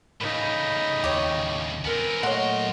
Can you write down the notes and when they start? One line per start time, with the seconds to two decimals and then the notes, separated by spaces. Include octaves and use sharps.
0.21 A2 C#3 D#4 B5 G6
1.04 D#2 G4 C#5
1.85 B3 C4 A#4 G#5
2.23 A#2 F#3 A3 C#5 D#5 F#5 C6